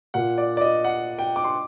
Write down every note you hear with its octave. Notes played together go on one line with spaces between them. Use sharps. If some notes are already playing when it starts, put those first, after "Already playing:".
A#2 F#5
D5
D5
D#5
F#5
G5
D6
C6